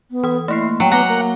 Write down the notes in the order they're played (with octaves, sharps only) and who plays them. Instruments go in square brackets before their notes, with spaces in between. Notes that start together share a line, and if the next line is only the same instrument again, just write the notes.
[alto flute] B3
[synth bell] E3 D#6
[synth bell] A3 A#3 C7 [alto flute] E4
[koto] F#3 [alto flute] G5 [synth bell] F#6 C#7
[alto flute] B3 [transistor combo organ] F#5 [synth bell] G#5 D6 G7 [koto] A#5
[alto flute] A#3